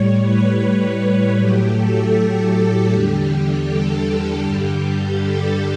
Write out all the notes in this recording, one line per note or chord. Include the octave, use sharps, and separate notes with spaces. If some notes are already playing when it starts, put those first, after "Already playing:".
Already playing: A2 G3 C#5
B4
B4
A2 F#3 A3 G4
A4
A4
E2 D3 G3 G4
A4
G2 D3 G3 G4
A4